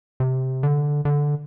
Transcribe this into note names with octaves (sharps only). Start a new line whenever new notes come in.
C3
D3
D3